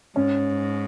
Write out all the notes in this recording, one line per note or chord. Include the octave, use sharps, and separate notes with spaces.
G#2 C#4